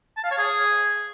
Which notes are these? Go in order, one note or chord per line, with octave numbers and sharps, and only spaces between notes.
A5
F5
C#5
G#4